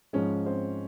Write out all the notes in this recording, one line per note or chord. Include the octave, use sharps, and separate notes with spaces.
G#2 F3 G#3 C#4 C#5
C4 C5